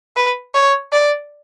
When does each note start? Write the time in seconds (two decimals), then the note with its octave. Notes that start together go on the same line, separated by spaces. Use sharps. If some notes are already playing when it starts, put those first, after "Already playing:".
0.16 B4
0.55 C#5
0.93 D5